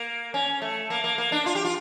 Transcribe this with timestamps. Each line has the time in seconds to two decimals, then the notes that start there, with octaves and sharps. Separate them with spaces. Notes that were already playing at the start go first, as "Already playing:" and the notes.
Already playing: A#3
0.34 C#4
0.62 A3
0.90 A#3
1.04 A#3
1.18 A#3
1.32 D4
1.46 F4
1.55 G4
1.65 F4